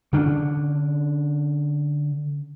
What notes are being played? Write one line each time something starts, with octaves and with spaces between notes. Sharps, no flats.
D3 C#4 D4